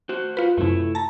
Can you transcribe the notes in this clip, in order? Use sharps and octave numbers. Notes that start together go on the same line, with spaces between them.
F#4 C5
F4 B4
F#2 C3 A3 E4
A5 A#5